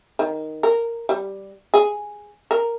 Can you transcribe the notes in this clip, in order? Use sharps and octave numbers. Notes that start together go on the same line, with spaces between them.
D#3
A#4
G3
G#4
A#4